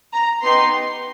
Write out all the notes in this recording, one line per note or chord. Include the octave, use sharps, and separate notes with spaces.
A#5
B3 D#4 G4 C6